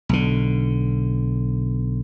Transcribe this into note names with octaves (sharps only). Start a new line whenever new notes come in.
B1 D3